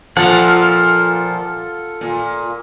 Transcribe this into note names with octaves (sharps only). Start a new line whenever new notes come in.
A#2 F3 F4 A4 F#5
A#2